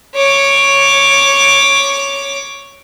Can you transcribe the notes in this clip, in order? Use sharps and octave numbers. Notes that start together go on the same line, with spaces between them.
C#5 D6